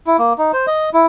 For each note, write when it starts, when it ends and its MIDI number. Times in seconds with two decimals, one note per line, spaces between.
0.07 0.17 64
0.19 0.33 58
0.38 0.52 63
0.53 0.66 72
0.67 0.90 75
0.94 1.06 64